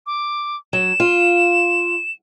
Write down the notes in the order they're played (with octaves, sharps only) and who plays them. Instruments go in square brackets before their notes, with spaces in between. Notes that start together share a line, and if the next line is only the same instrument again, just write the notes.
[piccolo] D6
[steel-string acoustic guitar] F#3 [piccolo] E7
[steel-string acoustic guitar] F4